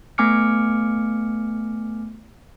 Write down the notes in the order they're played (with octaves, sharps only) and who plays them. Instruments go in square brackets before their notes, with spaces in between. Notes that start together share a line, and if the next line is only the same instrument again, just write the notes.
[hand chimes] A3 B3 G#5 D6 F6 C#7